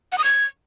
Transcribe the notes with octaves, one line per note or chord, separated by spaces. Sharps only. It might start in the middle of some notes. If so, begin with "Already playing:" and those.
F#5
D#6
G#6